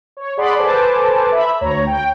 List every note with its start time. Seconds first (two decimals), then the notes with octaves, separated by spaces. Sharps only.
0.17 C#5
0.37 G#4 D5 F#5 B5 C6 D6
0.58 A4 B4 C5 G#5 A5 D6
1.31 E5 B5
1.61 D2 C#5 A#5
1.87 G5